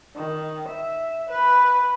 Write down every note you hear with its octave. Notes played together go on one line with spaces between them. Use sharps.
D#3
E5
B4